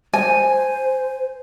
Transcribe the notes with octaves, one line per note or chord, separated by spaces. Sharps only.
C5 G#5